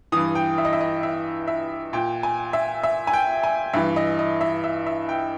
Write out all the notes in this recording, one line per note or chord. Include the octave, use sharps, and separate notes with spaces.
G2 E3 D#6
G5
E5
D#5
E5
D#5
E5
E5
A#2 G5
G#5
E5
E5
G#5
G5
G#5
G2 E3 E5
D#5
D#5
E5
E5
E5
G5